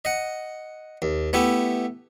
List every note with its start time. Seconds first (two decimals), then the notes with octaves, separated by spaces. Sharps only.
0.05 D#5 F#5
1.02 D#2
1.33 A3 B3 E4 G4